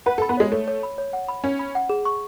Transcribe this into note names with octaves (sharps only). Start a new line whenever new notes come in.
B4 F#5
A4
B5
B3
G#3 C#5
A3 C#5
C#5
B5
C#5
F#5
B5
C#4 C#5
B5
F#5
G#4
C#6